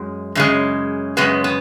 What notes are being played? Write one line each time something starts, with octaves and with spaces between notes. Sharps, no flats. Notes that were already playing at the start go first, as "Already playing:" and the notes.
Already playing: F#2 G#3
F#2 C#3 G#3
F#2 C#3 G#3 B3
B3